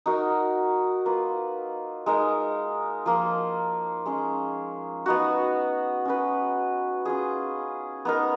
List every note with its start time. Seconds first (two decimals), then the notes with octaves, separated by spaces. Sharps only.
0.06 D#4 F#4 A#4
1.06 A#3 F4 B4
2.06 G#3 D#4 A#4
3.06 F3 A#3 F4
4.06 G#3 C#4 G#4
5.06 B3 D#4 F#4
6.05 C#4 F#4 B4
7.05 C#4 F4 G#4
8.05 B3 D#4 A#4